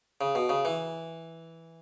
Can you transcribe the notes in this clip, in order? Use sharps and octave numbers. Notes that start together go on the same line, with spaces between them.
C#3
B2
C#3
E3